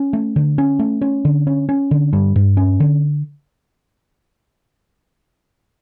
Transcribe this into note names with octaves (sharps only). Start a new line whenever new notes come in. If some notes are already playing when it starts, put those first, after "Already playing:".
Already playing: C#4
A3
D3
C#4
A3
C#4
D3
C#4
C#4
D3
G2
G2
C#4
D3